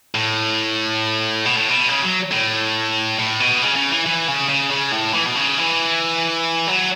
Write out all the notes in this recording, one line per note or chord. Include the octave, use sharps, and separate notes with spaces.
A2
B2
A2
B2
C#3
F#3
A2
A2
B2
C#3
C#3
E3
E3
C#3
C#3
C#3
A2
E3
B2
C#3
E3
F#3